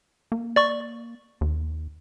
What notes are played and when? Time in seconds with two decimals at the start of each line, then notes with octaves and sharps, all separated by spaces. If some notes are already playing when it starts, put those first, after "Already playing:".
0.32 A#3
0.56 D5 C#6
1.41 D#2